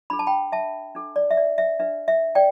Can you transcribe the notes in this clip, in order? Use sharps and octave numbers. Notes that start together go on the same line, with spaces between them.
D4 A4 B5
A5
G5 B5
E5 A5
D4 A4
D5
E5
D5
E5
D4 B4 E5
E5
D5 G5